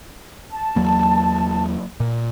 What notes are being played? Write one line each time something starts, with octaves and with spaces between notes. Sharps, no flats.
A5
E2 F#3 A#3
A#2